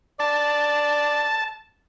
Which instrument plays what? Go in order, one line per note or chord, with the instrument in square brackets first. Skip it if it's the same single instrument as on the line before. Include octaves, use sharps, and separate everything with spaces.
[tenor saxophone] D5 [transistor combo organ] A5